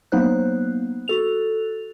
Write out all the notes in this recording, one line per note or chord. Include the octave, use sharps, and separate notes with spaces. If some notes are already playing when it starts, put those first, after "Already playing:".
F#3 A#3 B3 D#4 C5 F#6
F#4 A4 F7